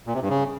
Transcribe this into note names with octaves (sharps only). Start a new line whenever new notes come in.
A#2
C3
G2
C#3